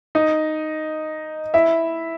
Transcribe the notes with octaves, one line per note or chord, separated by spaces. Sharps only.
D#4 D#5
E4 E5